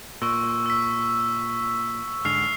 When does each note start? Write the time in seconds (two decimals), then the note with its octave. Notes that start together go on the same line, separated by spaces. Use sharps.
0.22 A#2 C#6 E6
0.66 E6 B6
2.25 G#2 D3 F6 C7 F7